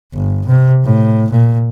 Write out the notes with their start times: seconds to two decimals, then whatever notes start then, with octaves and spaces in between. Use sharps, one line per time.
0.14 G1
0.47 C3
0.84 A2
1.31 A#2